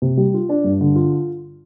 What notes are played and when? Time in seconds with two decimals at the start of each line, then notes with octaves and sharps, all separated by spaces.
0.02 C3
0.17 G3
0.34 F4
0.49 D4
0.64 G2
0.81 D3
0.96 F4